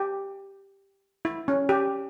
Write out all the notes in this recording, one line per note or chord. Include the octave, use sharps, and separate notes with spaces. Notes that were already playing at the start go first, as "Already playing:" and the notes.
Already playing: G4
E4
C#4
G4